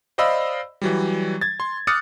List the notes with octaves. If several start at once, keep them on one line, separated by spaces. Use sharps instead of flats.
C5 D5 D#5 F5 B5 E6
E3 F#3 G3
G#6 A6
C6
D6 D#6 F6 F#6 A6 C#7